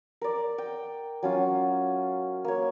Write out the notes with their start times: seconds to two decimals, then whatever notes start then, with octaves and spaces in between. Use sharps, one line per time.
0.21 A#4 D5
0.58 G5
1.23 F#3 C#4 F4
2.45 A#3 C#5